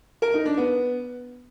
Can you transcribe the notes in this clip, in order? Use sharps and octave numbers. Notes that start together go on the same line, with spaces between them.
A#4
D#4
D4
B3